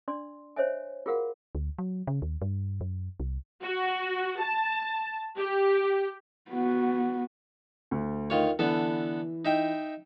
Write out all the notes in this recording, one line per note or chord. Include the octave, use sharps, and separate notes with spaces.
D4 D5 C6
C5 C#5 D#5 E5 G#5
F4 F#4 G#4 A#4 F5 F#5
D2
F#3
C#3
D#2
G2
F#2
C2
F#4
A5
G4
B3 F#4
D2
D#3 F4 C#5
D3 E3 B3 A4
D#4 E5 G5